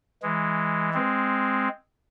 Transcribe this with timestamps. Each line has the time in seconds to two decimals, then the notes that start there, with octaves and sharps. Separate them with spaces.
0.23 E3 G#3
0.94 G#3 C4